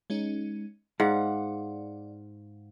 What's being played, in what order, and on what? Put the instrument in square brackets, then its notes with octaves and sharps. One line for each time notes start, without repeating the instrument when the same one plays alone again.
[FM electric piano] G#3 C#4 D#4
[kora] G#2 [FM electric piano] D5 [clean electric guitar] F5 F#5